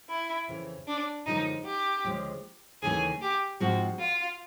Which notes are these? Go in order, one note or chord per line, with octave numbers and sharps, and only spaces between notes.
E4
F2 C#3 E3
D4
F#2 D3 F3 G#3 D#4
G4
D2 C#3 F3 G#3
D#2 C#3 E3 A3 C#4 G#4
G4
G#2 F3 G#3 C4 F#4
F4